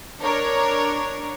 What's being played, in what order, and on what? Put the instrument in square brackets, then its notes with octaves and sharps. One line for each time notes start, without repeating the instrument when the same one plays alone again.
[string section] D4 A#4 C#5